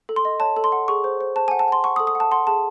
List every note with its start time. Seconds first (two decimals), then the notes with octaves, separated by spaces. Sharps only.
0.09 A4
0.16 C6
0.25 D#5
0.40 C#5 A5
0.56 A4
0.64 C6
0.72 F#5
0.88 G#4 C#6
1.04 C5
1.21 C5
1.36 C5 A5
1.48 G#5
1.51 F#5
1.59 A5
1.68 F#5 C6
1.84 F#5 C#6
1.96 D#6
2.00 A4
2.07 D#6
2.15 F#5
2.20 A5
2.31 F#5 C6
2.47 G#4 A5